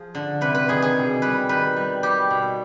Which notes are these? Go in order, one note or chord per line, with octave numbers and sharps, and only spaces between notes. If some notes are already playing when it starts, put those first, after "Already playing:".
Already playing: F3 G#4
D3
C3 B4
B4
D#3 G#4
G#4
B2
G3 B4
D#3 B4
G3
G3 G4
B2